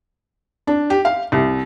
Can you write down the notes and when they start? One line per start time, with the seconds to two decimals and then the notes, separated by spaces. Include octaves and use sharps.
0.67 D4
0.90 G4
1.05 F5
1.32 C2